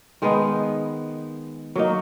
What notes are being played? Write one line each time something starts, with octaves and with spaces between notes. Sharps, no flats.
D#3 G#3 B3 D#4
F#3 A#3 D#4